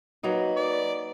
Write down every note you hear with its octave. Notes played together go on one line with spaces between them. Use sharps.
F#3 A#3 D#4 B4
D5